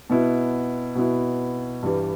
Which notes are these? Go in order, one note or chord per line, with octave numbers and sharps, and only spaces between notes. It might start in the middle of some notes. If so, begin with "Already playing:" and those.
B2 B3 E4
B2 B3 E4
G2 E3 G3